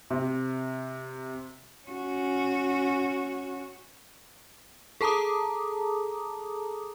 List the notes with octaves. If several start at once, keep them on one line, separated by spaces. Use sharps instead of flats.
C3
C#4 F#4
G#4 A4 A5 A#5 D6 D#6